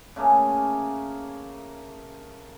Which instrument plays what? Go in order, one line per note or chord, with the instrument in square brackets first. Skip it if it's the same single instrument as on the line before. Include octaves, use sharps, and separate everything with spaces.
[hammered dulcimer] C#3 A3 A#3 G#4